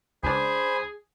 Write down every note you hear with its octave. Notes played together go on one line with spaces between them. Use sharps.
C#2 D4 G#4 C5 G#5 B5